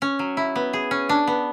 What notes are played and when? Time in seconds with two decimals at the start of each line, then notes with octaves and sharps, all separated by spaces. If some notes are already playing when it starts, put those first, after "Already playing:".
0.02 C#4
0.19 F#3
0.37 E4
0.56 B3
0.73 G#4
0.91 C#4
1.09 D4
1.27 B3